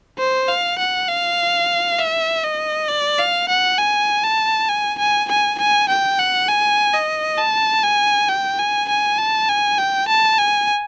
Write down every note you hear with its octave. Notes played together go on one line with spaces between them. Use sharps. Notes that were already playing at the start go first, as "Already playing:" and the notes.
C5
F5
F#5
F5
E5
D#5
D5
F5
F#5
G#5
A5
G#5
G#5
G#5
G#5
G5
F#5
G#5
D#5
A5
G#5
G5
G#5
G#5
A5
G#5
G5
A5
G#5